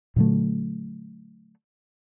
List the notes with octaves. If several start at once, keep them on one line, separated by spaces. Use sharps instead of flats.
A#2 D3 F#3 A3